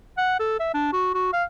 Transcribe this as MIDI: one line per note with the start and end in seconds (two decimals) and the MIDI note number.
0.18 0.35 78
0.40 0.58 69
0.60 0.72 76
0.74 0.93 62
0.93 1.10 66
1.14 1.32 66
1.33 1.44 77